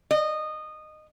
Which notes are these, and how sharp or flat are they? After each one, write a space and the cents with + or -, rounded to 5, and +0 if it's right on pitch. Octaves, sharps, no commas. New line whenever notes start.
D#5 -15